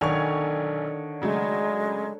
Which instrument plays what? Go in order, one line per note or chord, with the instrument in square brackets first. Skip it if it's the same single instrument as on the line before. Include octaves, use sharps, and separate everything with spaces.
[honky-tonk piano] B1 G#5 F7 [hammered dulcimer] D3 C#5 [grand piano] D#3 C#6
[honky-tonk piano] C#3 F#3 A3 [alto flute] G#3